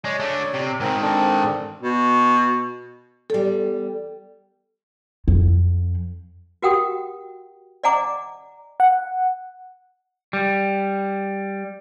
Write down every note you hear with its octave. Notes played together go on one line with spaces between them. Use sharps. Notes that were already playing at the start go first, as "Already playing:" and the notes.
G#3 C#5 D5
A3 D4
C3
G#2 D#3 C4 A#4
C4 D4 A4
B2
E2 G3 A4
F2
F#4 G4 A#4 F#5 G5 D#6
D5 D#5 F#5 G#5 A#5 D6
F#5
G3